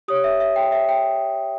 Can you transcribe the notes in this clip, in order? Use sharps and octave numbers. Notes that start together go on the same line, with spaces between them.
G4 C#5 D#6
E5
E5
G5
E5
G5